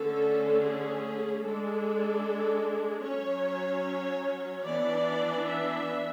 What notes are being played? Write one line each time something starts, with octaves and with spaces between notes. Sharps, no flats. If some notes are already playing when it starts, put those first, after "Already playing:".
Already playing: D3 A3 C#4 A4
G#4
G#3 D4 A4
F#3 C#4 C#5
E3 B3 D4 D5
E5